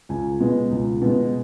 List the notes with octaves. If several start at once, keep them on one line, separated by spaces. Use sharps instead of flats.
C#2 G#5
B2 G#3
C#2
B2 G#3